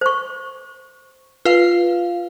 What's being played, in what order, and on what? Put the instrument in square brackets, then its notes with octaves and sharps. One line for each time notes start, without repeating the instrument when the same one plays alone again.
[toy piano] C5 C#6
[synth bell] F4 F5 [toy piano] B4